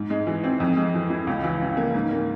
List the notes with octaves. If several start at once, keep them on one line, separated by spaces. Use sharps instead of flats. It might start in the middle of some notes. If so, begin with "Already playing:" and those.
Already playing: G#2
G#3
E3
C4
F2
G#3
E3
E4
C#2
E3
C#3
A#3
G#2
A#3